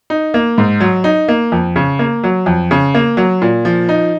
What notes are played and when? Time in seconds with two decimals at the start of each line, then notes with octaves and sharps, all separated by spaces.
0.10 D#4
0.34 A#3
0.58 G#2
0.80 F#3
1.04 D#4
1.28 A#3
1.52 F2
1.76 C#3
1.99 A#3
2.23 F#3
2.46 F2
2.71 C#3
2.94 A#3
3.17 F#3
3.42 A#2
3.65 F3
3.89 D#4